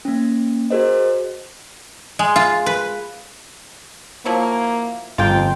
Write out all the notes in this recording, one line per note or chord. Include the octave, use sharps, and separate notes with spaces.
A#3 C#4
F#4 G#4 A#4 C5 D#5
G#3
F4
B4
F3 F#3 A#3 E4
G1 F2 G#3 A#3 F4 G5